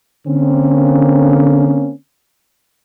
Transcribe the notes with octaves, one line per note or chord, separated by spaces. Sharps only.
D3 A#3 C4 C#4